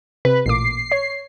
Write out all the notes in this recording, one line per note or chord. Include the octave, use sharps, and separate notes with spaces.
C3 B4
A1 A#2 D6 C7
C#5